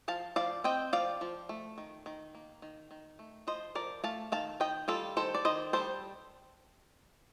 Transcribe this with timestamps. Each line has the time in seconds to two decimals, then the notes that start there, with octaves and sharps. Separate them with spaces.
0.08 F3 F5 A5
0.36 F3 D5 F5
0.64 C4 D#5 G5
0.93 F3 D5 F5
1.21 F3
1.49 A3
1.78 D#3
2.06 D#3
2.35 A#3
2.62 D#3
2.91 D#3
3.19 A3
3.47 F3 C5 D#5
3.75 F3 A#4 D5
4.04 A3 F5 A5
4.32 D#3 F5 A5
4.60 D#3 D#5 G5
4.88 G3 F4 A4
5.17 D#3 A4 C5
5.34 D5
5.45 D#3 C5 D#5
5.73 G3 A4 C5